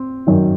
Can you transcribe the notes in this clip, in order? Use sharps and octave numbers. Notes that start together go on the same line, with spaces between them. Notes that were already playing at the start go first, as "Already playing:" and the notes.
Already playing: C4
F#2 D#3